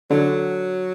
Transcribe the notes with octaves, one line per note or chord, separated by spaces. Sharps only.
D3 F#3